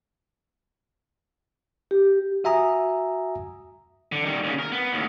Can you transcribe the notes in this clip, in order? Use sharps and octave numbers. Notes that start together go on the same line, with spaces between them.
G4
F#4 E5 G#5 A#5 D#6
D3
D#3 G3
D#2 C#3
A#4
B3
D#2 A2